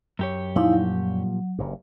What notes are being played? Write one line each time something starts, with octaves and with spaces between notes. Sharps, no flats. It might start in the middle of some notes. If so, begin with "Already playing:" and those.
F#2 G4 C#5
A#2 F3 G3 D#4 E4 F5
F#3
F#1 G2